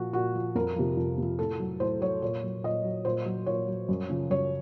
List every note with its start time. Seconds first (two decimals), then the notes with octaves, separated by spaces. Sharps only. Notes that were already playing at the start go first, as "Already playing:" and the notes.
Already playing: A#2 F3 F#4
0.13 A#2 F#4
0.35 F3
0.55 F2 A#4
0.76 C3 F3
0.97 F2
1.18 C3 F3
1.39 A2 A4
1.60 F#3
1.80 A2 C5
2.01 F#3 C#5
2.22 A#2 C#5
2.44 F#3
2.64 A#2 D#5
2.85 F#3
3.05 A#2 C5
3.26 F#3
3.46 A#2 C#5
3.68 F#3
3.89 F#2
4.10 C#3 F3
4.30 F#2 C#5